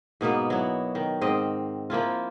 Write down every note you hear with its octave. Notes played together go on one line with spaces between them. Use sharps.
G#2 B2 A#3 B3
F#3 E4
D#3
G#2 C4 D#5
F3 A#3 E4 F4